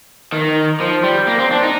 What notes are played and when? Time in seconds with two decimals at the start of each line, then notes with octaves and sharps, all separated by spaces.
0.32 D#3
0.80 F3
1.04 G3
1.27 A#3
1.39 C4
1.51 D4
1.63 D#4